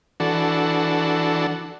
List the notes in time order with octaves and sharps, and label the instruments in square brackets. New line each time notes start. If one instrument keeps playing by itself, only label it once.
[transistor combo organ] E3 D4 F#4 A4